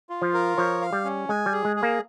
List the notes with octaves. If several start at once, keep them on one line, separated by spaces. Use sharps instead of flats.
F4
F3
A#4
F3 C#5
F5
G3
C#4
G#3 G#5
G3
G#4
G#3
G#4
A#3